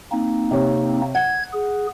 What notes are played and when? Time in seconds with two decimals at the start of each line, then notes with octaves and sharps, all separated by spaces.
0.12 A#3 C4 D#4
0.51 C3 C#5
1.15 F#5 G#6
1.53 G#4